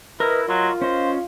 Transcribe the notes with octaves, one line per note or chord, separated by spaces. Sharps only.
E4 A#4 B4 D#5 F6
F#3 F4 D#5 C6
C#4 C5 D#5